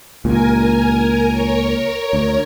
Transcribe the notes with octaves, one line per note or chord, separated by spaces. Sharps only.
C#2 A#2 A#4 G#5
A#4 C#5
D2